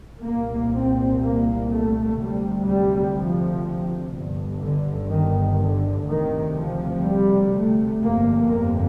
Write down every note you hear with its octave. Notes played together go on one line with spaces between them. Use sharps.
C2 A#2 A#3
C4
A#3
A3
D2 C3 G3
G3
F3
G1 G2
D3
D#3
D3
D2 C3 D#3
F3
G3
A3
G1 F2 C3 A#3
A#3